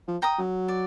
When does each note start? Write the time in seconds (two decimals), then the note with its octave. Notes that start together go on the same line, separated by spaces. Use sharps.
0.08 F3
0.22 G5 A#5 D#6
0.38 F#3
0.68 D5